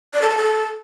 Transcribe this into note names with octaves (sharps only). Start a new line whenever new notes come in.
D5
A4
A5
A4